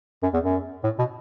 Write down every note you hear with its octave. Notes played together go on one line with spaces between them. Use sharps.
F#2
E2
F#2
A2
B2